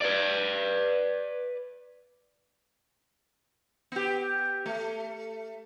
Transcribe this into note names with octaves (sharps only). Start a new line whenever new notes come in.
B4 D5
B3 G4
A3